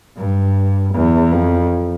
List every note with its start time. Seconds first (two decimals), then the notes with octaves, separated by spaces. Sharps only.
0.17 G2
0.94 E2
1.32 F2